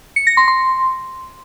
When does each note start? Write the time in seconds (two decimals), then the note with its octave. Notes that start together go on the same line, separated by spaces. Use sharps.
0.16 C#7
0.27 A#6
0.37 C6
0.48 C6